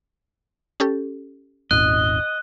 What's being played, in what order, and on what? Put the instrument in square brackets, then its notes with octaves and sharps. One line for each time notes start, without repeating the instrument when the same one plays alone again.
[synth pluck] C#4 G4 A4
[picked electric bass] D#1 G#1 [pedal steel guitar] D#5 [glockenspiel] F#6